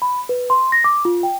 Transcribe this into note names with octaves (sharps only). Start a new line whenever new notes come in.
B5
B4
C6
A#6
D6
F4
G5